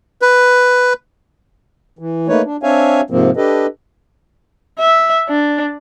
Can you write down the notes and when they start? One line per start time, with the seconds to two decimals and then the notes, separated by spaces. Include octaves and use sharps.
0.22 B4
1.99 E3
2.28 A3 A#3 D#4 B4 C#5
2.45 D4
2.63 C4 D4 C#5 E5 F5 G#5
3.10 G#2 C3 F3 A#3 C4
3.37 D4 G4 A4 B4 D#5
4.79 E5
5.29 D4